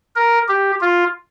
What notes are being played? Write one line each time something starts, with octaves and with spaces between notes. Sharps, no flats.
A#4
G4
F4